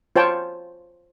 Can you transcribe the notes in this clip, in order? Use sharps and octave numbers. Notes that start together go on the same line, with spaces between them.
F4 C5 C#5 G5 A5